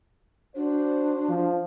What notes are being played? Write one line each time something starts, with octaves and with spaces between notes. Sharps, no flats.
D4 F#4 C5
F3